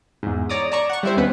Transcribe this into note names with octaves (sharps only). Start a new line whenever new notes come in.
E2 G#2
C#5 D5 A#5 D6 D#6
D5 A5 A#5 C#6
F#5 C#6
G3 E4 C5
D#2 B3 C#4 B4